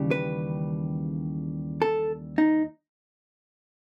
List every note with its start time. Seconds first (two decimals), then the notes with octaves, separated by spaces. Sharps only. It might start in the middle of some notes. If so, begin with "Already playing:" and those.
Already playing: D#2 C#3 E3 G3
0.11 B4
1.82 A4
2.38 D#4